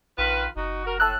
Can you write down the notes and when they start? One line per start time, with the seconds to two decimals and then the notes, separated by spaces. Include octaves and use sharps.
0.18 A#1 D#3 F4 B4
0.56 F#1 D#4 F#4
0.85 F#4 A#4
1.00 A2 A5 E6 F#6